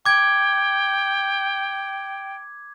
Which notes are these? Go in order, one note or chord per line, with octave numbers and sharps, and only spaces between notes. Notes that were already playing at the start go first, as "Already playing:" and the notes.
G5 D6 G#6